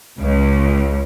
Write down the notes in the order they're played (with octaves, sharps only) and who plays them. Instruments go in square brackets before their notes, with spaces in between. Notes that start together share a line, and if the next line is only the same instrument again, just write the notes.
[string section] C#2